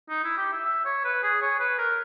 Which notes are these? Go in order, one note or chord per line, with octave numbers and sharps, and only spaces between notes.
D#4
E4
G4
E5
E5
C#5
B4
G#4
C#5
B4
A#4